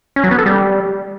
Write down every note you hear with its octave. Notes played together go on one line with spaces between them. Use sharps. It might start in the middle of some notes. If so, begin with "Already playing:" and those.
C#4
F#3
B3
A4
G3